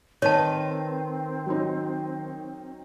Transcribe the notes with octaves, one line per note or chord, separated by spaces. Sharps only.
D#3 C4 B4 C#5 A5
F#3 C#4 D#4